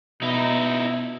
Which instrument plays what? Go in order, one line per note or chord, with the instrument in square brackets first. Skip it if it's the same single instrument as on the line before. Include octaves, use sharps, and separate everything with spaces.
[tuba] B2 [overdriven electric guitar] D#4 E4